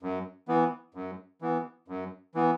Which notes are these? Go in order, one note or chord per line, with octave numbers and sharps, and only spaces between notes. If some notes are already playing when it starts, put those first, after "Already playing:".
F#2
E3 B3
F#2
E3 B3
F#2
E3 B3